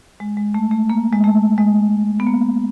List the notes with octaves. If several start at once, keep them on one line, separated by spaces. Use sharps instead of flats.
G#3
G#3
A3
A3
A#3
G#3
A3
G#3
B3
A#3